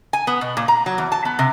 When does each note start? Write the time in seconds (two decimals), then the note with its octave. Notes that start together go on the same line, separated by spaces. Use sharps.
0.13 G#5
0.27 B3
0.41 B2
0.57 A#2
0.68 A#5
0.86 F#3
0.98 E2
1.12 A5
1.25 B3
1.39 C3